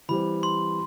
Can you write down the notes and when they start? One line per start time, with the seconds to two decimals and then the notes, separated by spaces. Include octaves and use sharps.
0.09 E3 G3 C4 B5
0.43 C6